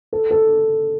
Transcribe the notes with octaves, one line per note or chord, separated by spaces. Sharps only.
A4
A4